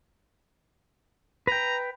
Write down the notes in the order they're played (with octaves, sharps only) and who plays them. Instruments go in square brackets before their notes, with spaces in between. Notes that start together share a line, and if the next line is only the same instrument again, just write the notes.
[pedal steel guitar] B4 G5 [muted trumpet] A#5